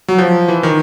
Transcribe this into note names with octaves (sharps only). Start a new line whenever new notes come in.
F#3
F3
E3
D#3